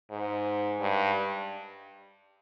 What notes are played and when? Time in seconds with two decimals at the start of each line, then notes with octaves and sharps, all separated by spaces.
0.11 G#2
0.80 G2